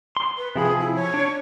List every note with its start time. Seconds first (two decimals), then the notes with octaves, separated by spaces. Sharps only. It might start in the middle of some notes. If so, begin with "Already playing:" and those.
0.17 C6
0.37 B4
0.56 C3 F3 G#4 B5
0.80 E4
0.95 C#5
1.14 D4